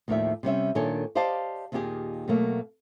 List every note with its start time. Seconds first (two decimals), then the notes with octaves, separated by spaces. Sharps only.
0.08 D#2 A2 D#3 F3 D5 E5
0.43 C3 G3 C#4 E5
0.75 A#2 D#3 D4 A4 C#5 G#5
1.15 G4 C5 D5 D#5 F5 A5
1.72 D#2 A#2 D#3 D#4 G4 G#4
2.28 B2 F#3 A3 A#3